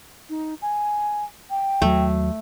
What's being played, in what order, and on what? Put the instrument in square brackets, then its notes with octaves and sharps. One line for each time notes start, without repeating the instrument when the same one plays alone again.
[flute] D#4
G#5
G5
[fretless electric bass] D#2 F#3 [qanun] A3